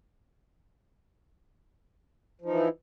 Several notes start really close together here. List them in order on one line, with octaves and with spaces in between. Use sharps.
F3 D#4 E3 E4